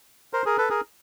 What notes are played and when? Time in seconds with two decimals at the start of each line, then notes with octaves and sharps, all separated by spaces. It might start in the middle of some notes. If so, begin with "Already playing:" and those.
0.33 A#4 C5
0.46 G#4 A#4
0.58 A4 B4
0.70 G#4 A#4